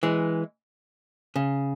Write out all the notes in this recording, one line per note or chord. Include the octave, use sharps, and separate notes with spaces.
E3 G#3
C#3